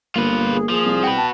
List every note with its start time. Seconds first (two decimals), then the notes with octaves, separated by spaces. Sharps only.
0.16 G1 A#3 F4 B4
0.52 G#4
0.70 F3 G#4
0.84 C2
1.04 F#4 B4 G5
1.16 A5